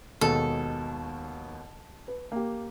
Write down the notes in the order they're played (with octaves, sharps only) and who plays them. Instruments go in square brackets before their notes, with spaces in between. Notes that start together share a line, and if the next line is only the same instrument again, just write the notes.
[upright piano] D#2 B2 G#3 [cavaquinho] A4
[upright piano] B4
A#3 G4